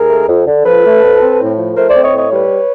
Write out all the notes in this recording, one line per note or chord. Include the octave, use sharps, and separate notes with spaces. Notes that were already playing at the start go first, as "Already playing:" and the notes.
Already playing: D#2 G#4 A#4
A3
F2
D3
F3 A4 B4
A3
F2
C4
A2
F3
A3 A#4 C5
C5 D5
C4
C#5 D#5
A2
C#5 D#5
G3 B4 C#5